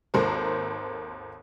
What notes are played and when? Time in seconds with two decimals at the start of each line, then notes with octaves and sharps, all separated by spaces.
0.14 G#1 D#2 A4 A#4 C5